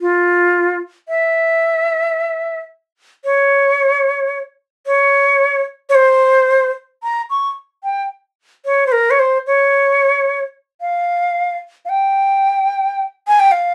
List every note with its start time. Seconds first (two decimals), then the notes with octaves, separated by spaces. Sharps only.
0.01 F4
1.09 E5
3.25 C#5
4.87 C#5
5.89 C#5
5.95 C5
7.03 A#5
7.30 C#6
7.84 G5
8.65 C#5
8.86 C5
8.92 A#4
9.11 C#5
9.19 C5
9.47 C#5
10.81 F5
11.85 F5
11.89 G5
13.27 G#5
13.40 G5
13.51 F5